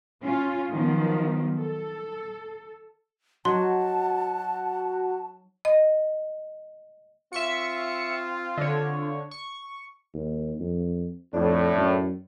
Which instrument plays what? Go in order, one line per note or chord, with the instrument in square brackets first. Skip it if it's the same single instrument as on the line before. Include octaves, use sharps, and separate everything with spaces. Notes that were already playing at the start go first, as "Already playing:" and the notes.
[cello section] C#4 F4
D#3 F3 F#3 B3
A4
[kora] F#3 D#4 [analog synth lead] F#4 [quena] A5 [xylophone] C6
[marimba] D#5
[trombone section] C4 F4 [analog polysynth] E5 C#6 C#7
[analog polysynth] D3 C#5
C#6
[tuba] D#2
F2
[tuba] F2 [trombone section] A2 [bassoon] D4
[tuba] F#2